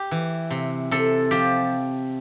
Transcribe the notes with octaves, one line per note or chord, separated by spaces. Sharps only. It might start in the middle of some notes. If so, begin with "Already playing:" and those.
Already playing: G4
E3
C3
C3 A4
F3 G4